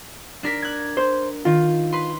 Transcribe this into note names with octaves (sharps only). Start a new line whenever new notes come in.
D4 A#4 B6
F#6 G#6
C5
D#3 F4
B4 C6